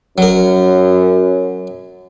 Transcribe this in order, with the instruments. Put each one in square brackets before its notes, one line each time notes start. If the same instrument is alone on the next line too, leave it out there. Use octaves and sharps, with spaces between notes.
[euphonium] F#2 [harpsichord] F#3 A#4